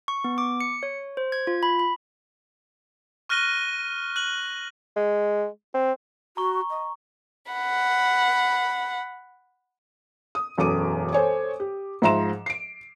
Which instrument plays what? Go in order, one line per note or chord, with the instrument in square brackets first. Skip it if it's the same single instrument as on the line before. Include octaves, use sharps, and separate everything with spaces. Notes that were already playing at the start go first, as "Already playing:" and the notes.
[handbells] C#6
B3
D6
C#7
C#5
C5
G#6
F4
B5
B5
[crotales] C#6 F6 F#6 A#6 D#7 G7
F#6 F#7
[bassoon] G#3
C4
[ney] F#4 [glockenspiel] A#5 C#6
[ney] D#5
[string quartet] F#5 B5
[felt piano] D#6
E1 F#2 A4 D6 D#7
A4 C5 C#5 G#5
G4
G#2 F3 E5 A#5 C6 E7
C7 D7